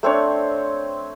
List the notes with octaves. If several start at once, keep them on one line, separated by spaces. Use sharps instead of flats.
A3 C4 D4 C#5